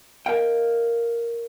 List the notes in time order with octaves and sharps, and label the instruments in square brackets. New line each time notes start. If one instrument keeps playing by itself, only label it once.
[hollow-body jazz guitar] A#4 D#5 F5 G5